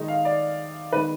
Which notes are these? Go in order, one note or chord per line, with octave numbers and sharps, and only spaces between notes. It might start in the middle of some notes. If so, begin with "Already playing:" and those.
Already playing: D#3 G#3 D#4
F5
D5
D#3 G#3 B3 B4